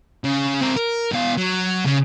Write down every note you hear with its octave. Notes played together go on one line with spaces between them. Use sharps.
C#3
C4 A#4
A#4
B2 F5
F#3
C#3